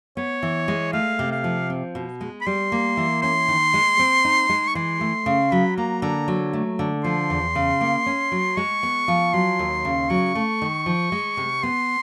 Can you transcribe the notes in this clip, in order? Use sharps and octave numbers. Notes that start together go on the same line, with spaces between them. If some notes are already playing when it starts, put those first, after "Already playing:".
B3 C#5
E3
G#3
A3 F5
C3
F5
F3
C4
B2
G#3
B5
G3 C6
A#3
E3
C#4 C6
D#3
G#3
C4
D#4
G#3
C#6
E3 C6
A3
C#3
F#3 B5
A#3 A#5
D3 A#5
F#3
A3
D3
F3 C6
E2
C#3
A#3
C#4
F#3
G#3 C#6
B3
F3
F#3 C6
D#2
C#3
F#3 C#6
A3
D#3
F3
G#3
C3
B3 C6